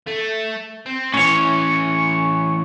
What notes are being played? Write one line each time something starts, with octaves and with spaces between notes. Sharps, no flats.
A3
C4
A2 E3 C#4 C#5